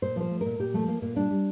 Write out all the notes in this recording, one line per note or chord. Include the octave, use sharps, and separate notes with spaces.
A#2 C5
F3 C5
A3
A#2 A#4
A#2 G4
F3 A3
A3 A#3
A#2 A#3
G3 D4
G3